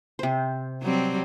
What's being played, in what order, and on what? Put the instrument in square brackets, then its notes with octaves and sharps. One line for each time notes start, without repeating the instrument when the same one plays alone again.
[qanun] C3 C5
[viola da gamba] F#3 G3 C4